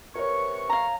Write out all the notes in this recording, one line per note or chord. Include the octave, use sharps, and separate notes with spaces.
C3 A#4 B4 C#5 C#6
F5 A#5